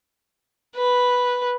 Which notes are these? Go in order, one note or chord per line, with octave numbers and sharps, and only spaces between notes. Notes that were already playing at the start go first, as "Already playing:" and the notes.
B4